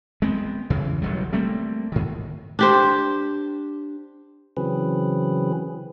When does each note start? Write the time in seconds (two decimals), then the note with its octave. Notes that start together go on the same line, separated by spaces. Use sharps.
0.22 G#3 B3 C4
0.70 E2 C#3 E3
1.02 E1 A1 F#3 G3
1.33 G3 A3 A#3 C4
1.92 G#2 D#3
2.59 D4 G4 C5
4.57 C#3 E3 F#3 C4 G#4 B4